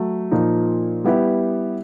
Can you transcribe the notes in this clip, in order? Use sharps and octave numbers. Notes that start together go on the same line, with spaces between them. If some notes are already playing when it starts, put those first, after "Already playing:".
Already playing: F#3 A3
A#2 F3 A#3 D#4
G3 B3 E4 G4